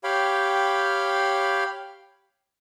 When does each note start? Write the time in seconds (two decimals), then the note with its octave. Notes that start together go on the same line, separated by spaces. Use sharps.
0.04 G4 C#5 F5 G5 B5